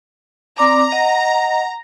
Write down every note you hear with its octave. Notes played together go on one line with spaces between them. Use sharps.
C4 D5 A#5 D6
D#5 F#5